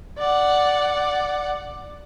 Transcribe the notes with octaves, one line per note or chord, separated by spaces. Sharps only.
D5 F#5